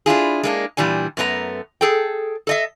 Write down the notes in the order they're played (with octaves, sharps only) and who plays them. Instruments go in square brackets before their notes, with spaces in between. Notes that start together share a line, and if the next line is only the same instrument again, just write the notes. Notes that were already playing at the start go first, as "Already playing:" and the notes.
[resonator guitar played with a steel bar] D4 E4 F4 G#4
G#3 A#3 D4
A#2 E3 G3 D4 G#5
F#2 A3 B3 D4 A#5
G#4 A4 G5
A4 D#5 E5